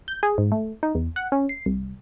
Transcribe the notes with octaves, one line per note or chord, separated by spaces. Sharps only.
G6
G#4
G#2
A3
D#4
E2
F#5
C#4
C7
C2